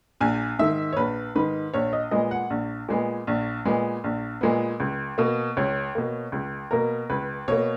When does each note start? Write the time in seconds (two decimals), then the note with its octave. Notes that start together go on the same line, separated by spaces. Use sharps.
0.20 A#1 G#5
0.59 G#2 D#3 E5
0.93 C#5
0.97 A#1 B4
1.35 G#2 D#3 B4
1.74 A#1 C#5
1.93 D#5
2.11 A#2 G#3 B3 D#5
2.31 F#5
2.50 A#1
2.88 A#2 G#3 B3
3.27 A#1
3.65 A#2 G#3 B3
4.04 A#1
4.41 A#2 G#3 B3
4.80 C#2
5.18 B2 A#3
5.57 C#2 C#5
5.95 B2 A#3
6.32 C#2
6.71 B2 A#3 A#4
7.10 C#2 B4
7.48 B2 A#3 C#5